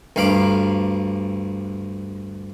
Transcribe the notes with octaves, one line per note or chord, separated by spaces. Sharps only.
D2 G2 F5 A#5 B5 D6